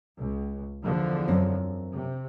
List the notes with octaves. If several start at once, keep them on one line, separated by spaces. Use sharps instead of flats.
C#2
E2 D3 F3
F#2 C4
C3